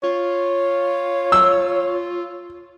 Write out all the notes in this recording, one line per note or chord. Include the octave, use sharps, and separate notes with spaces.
F4 C#5
E6